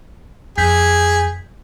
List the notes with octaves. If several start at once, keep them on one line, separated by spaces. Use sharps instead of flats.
F2 G#4 G6 B6